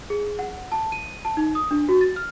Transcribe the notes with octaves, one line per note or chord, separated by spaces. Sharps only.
G#4
F#5
A5
D#7
A5
D#4
D#6
D4
F#4
A6
F6